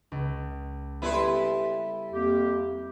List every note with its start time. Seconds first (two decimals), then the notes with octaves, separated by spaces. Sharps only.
0.12 C#2
1.02 G3 B3 E4 A4 B4 C6
2.13 F2 A#3 G4